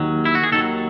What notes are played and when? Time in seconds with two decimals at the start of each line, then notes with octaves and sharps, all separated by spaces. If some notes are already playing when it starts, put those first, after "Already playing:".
Already playing: D#2 D#3 F#3
0.25 E4
0.35 F#4
0.43 G#4
0.52 D#2 D#3 F#3 A4